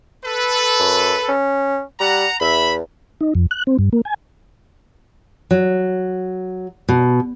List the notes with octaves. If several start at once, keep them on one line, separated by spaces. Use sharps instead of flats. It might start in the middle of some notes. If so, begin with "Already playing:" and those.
A4 B4
F#2
C#4
G3 F#5 A#5
E2 E5 B5
D#4
F2
F#6
C4
G2
A#3
G#5
F#3
B2